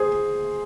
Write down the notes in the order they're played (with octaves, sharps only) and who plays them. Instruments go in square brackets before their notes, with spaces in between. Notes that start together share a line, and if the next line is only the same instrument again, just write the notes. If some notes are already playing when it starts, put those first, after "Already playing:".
Already playing: [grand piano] G#4 C5